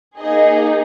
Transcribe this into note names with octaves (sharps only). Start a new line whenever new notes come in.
A#3 D#4 G#4 D#5